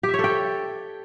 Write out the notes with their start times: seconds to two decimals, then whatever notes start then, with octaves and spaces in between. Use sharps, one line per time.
0.03 G4
0.09 E5
0.14 C#5
0.19 A4
0.24 G5